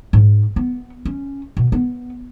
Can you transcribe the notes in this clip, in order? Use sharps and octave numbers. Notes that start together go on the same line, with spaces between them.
G#2
B3
C#4
B2
B3